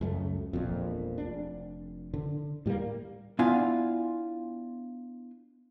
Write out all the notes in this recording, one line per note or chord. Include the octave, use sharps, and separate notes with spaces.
C#2 F#2 G3 A3
E1 A#1 F2
F1 D4
D3
A2 G3 A3 A#3
B3 D4 E4 F4 F5 G#5